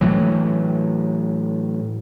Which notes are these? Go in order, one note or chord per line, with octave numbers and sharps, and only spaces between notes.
A2 E3 F#3